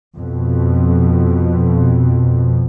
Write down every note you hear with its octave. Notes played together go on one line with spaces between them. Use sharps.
F2 B2